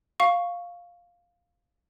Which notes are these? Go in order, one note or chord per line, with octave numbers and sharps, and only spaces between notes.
F5 C#6